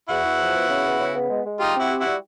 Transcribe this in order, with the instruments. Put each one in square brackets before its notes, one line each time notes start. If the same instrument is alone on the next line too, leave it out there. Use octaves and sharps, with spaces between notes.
[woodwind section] E2 [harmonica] E4 F#4
[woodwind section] E2
F3
B3
C#3
B3
C#3
B3
G#3
G#3
[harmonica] D#4 F4 [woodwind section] G4
[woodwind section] C4 [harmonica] E4 F#4
[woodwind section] G4
[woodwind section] G3 [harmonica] E4 F#4